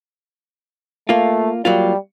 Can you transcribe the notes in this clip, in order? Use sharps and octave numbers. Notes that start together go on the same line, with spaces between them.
A3 A#3 F4
F#3 G3 A#3 F4